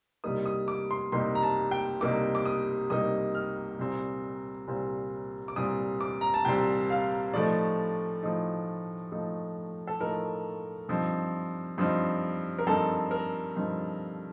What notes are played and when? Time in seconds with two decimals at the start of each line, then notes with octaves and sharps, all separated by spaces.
0.24 C2 C3 G3 A#3 D#4 D#6
0.46 D#6
0.68 D6
0.91 C6
1.12 C2 C3 G3 A#3 D#4 C6
1.35 A#5
1.43 A5
1.71 G5
2.01 C2 C3 G3 A#3 D#4 D6
2.35 D6
2.46 D#6
2.90 C2 C3 G3 A#3 D#4 D#6
3.35 F6
3.79 C2 A#2 G3 C4
4.68 C2 A#2 G3 C4
5.48 D6
5.56 C2 A#2 G3 C4 D#6
6.01 D6
6.21 A#5
6.34 A5
6.45 C2 A#2 G3 C4 G5
6.90 F5
7.34 A2 F3 A3 D#4 D5
8.23 A2 F3 A3 D#4
9.12 A2 F3 A3 D#4
9.87 A4
10.00 A2 F3 A3 D#4 A#4
10.89 G2 F3 C4 D#4
11.78 G2 F3 C4 D#4
12.59 A#4
12.67 G2 F3 C4 D#4 A4
13.11 A#4
13.56 G2 F3 C4 D#4